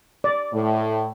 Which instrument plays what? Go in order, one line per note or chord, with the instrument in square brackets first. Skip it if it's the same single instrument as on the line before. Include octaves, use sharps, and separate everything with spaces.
[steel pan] D5
[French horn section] A2